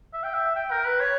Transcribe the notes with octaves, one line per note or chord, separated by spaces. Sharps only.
E5
G5
E5
G5
A#4
B4
C#5